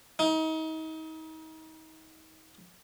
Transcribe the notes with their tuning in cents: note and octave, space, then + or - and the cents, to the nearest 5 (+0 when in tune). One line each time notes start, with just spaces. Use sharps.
D#4 +35